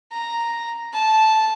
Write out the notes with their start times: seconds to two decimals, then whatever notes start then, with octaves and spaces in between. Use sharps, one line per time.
0.12 A#5
0.93 A5